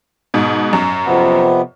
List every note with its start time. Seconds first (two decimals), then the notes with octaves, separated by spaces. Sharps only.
0.34 G#2 B2
0.73 F#2
1.06 F2 C3 B3